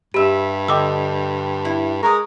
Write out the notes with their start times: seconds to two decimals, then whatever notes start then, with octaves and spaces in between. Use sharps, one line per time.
0.14 G2 G4 E5 B5
0.68 D3 D#5 G5 D6 E6
1.65 E4
2.03 G#3 A#4 A#5 C#6 D#6